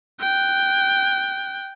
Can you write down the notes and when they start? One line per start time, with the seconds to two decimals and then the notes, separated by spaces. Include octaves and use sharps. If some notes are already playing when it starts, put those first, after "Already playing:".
0.20 G5 F#6